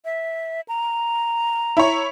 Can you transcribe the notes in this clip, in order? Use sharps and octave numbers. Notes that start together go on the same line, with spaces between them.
E5
A#5
E4 C#5